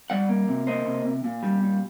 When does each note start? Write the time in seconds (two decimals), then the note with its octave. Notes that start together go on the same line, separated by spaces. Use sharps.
0.10 G3 D5 F#5
0.29 A#3
0.48 C3
0.67 A#3 C5 D#5
0.86 C3
1.05 C3
1.24 A#2
1.43 G3
1.62 A#2